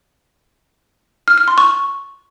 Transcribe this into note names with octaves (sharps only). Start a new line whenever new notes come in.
F6
F6
C6
C#6